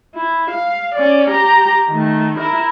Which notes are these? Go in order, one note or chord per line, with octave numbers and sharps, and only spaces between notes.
E4
F5
C#4 D5
G4 A#5
D#3 A3
E4 A#4